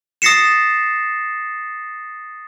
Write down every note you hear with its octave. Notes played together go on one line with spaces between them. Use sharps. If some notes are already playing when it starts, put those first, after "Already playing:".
D#6 A6 A#6 C7 C#7 E7